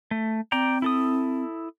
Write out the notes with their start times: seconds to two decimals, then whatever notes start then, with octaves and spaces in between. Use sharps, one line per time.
0.11 A3
0.52 C4 D5 G5 A#5
0.82 E4 A4 D#6